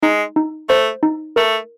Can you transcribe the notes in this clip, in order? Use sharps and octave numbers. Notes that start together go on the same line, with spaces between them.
G#3 D#4
D#4
A3 C5
D#4
A3 A#4